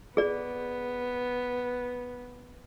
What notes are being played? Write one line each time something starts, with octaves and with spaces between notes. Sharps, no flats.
B3 G#4 D5